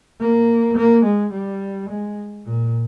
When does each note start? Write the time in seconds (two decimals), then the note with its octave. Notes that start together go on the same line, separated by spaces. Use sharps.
0.20 A#3
0.77 A#3
1.04 G#3
1.32 G3
1.89 G#3
2.45 A#2